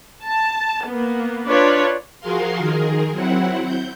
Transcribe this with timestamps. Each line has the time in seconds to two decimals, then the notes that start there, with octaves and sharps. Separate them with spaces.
0.22 A5
0.86 A#3 B3
1.47 D4 F4 B4 C#5 D5
2.20 F3 F#4 G#4 A#4 F5 C6
2.58 D#3 G#4 A#4
3.12 F#3 C4 E4 F#5
3.65 G6